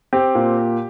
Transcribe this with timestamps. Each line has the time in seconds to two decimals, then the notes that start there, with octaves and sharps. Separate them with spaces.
0.13 C4 G4
0.35 A#2